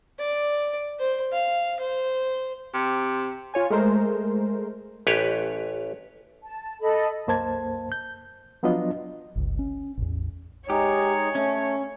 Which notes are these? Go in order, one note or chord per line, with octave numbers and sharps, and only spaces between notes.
D5
C5
F5
C5
C3
F4 C#5 G#5
G#3 A3 A#4 C5
A1 G4 B4 C#5
A5
A4 D#5 B5
C2 F#2 A#3 C5 A5 G#6
G6
F3 F#3 B3 D4 F4 D#5
G1 C#2
C#4
A1 E2
G#3 D#4 G4 C#5
A3 C#4